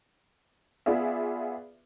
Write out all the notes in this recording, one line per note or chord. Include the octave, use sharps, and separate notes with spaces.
B3 F4 G#4 D5 E5